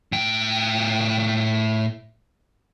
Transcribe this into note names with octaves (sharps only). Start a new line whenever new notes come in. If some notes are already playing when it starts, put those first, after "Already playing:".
A2 G5